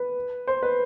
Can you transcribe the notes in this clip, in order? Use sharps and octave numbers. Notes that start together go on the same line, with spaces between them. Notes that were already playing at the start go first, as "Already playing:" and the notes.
Already playing: B4
C5
B4